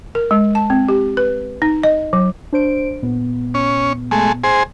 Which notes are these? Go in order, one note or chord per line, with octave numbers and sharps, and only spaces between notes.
A#4
G#3
A5
C4
G4
B4
D#4
D#5
F#3
D4 C5 D7
A#2 B3
C#4
G#3 A3
G#4 C5